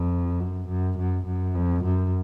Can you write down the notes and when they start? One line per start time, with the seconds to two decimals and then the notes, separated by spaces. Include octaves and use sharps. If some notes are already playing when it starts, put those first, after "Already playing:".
Already playing: F2
0.40 F#2
0.68 F#2
0.98 F#2
1.26 F#2
1.55 F2
1.84 F#2